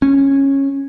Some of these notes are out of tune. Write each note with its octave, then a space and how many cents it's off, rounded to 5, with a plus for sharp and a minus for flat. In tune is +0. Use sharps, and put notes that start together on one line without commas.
C#4 -15